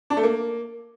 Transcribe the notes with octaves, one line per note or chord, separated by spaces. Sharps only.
D4
A3
A#3